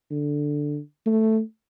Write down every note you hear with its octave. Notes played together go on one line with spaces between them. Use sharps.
D3
A3